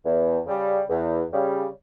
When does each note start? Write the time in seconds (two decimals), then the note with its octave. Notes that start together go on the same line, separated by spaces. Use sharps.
0.05 E2
0.47 C#3 G3
0.89 E2
1.32 C#3 G3